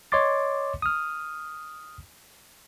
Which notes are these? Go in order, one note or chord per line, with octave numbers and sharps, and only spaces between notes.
C#5 D#5 C6 D6 A6
D#6 F6